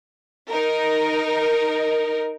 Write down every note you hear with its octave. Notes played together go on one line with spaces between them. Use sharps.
D#4 A#4